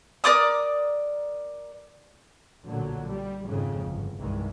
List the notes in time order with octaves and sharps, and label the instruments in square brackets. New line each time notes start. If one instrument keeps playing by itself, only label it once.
[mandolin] A#4 D5 D6 D#6
[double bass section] B1 A#2 D3 F#3
G3
G#1 F2 G#2 C#3
G1
C2 G2 D#3 E3 G#3